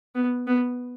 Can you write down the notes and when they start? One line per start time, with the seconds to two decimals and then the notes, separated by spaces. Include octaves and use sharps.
0.15 B3
0.47 B3